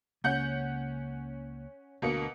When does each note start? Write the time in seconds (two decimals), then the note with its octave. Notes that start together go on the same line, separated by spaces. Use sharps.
0.24 C#2 C#3 A#3 C#4 F#5 G6
2.02 D2 B2 D3 A#3 C#7